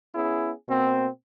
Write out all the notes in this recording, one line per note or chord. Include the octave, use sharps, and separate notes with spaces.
B3 C#4 E4 G#4
B2 A#3 C4